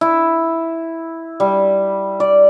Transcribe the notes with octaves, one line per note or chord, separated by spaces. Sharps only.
E4
G3
D5